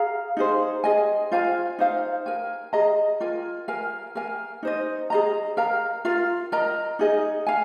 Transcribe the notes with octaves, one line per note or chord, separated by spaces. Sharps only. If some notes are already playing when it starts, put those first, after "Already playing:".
Already playing: G#4 F5 A#5
D#4 G#4 C5
G#4 D#5 G#5
F4 C5 F5 G#5
D#4 C5 F5
A#4 G#5
G#4 D#5 A#5
F4 A#4 G#5
A#4 F5 G#5
A#4 F5 G#5
D#4 C5 D#5
G#4 D#5 A#5
A#4 F5 A#5
F4 A#4 F5
A#4 D#5 A#5
D#4 G#4 D#5
F5 G#5